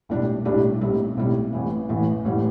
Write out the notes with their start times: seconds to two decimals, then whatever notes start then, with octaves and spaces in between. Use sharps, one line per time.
0.09 B1 A2 G3 D4 G4
0.45 B1 A2 G3 D4 G4
0.81 B1 A2 G3 C4
1.16 B1 A2 G3 C4
1.53 A1 A2 E3
1.89 A1 A2 E3
2.25 A1 A2 G3